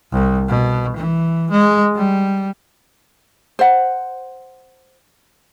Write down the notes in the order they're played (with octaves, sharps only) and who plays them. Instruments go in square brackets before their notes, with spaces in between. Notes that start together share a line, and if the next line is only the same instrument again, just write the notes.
[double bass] C2
B2
E3
G#3
G3
[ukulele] C5 F#5